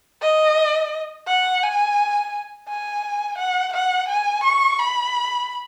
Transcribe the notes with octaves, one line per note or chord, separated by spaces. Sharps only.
D#5
F#5
G#5
G#5
F#5
F#5
G#5
C#6
B5